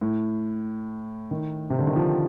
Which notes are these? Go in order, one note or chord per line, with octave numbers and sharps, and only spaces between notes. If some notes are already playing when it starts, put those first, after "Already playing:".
A2
D#3
C3
D3
D#3
F3